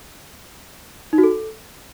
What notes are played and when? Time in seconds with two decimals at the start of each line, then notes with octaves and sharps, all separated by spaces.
1.13 D#4
1.18 F#4
1.23 A4